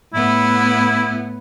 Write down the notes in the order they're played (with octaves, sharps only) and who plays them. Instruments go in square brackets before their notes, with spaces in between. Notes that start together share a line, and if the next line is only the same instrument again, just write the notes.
[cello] A2 B3 [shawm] E4